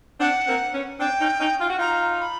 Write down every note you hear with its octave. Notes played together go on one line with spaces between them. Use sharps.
C4 D4 F#5
A#3 C4
B3 C#4
C4 D4 G5
C#4 D#4
C#4 D#4
F4
F#4
D#4 F4 A#5
B5